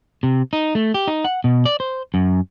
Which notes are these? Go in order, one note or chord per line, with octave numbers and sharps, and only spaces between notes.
C3
D#4
A3
G4
D#4
F#5
B2
D5
C5
F#2